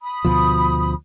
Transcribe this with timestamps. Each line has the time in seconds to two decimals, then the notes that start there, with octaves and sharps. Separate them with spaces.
0.01 B5 D#6
0.25 D2 B2 F3